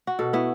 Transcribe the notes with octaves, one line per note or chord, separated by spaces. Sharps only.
F#4
B2 A4
B3 E4